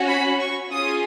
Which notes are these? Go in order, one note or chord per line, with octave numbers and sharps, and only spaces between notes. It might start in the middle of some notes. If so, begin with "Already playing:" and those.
Already playing: C#4 F#4
B5
C#6
C#4 F4 G#4 D#6